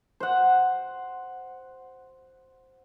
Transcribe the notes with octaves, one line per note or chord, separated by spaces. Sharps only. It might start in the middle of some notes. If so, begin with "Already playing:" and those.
C5 F#5